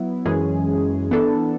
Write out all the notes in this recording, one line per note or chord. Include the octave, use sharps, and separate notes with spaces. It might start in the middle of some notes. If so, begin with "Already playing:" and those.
Already playing: F#3 B3 E4
F#2 E3 G#3 C#4 G#4
E3 B3 D4 A4